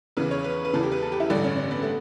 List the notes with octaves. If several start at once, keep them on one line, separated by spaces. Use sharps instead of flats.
E2 C#3 E3 B4
C#5
B4
B4
E2 C#3 E3 A4
G4
B4
A4
G4
E4
A1 G2 D3 D4
C#4
C#4
B3
A3